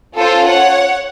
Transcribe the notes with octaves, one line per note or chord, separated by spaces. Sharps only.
C#4 F4 A4 C5
C#5 F#5